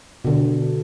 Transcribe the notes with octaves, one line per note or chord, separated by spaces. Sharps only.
B2 D3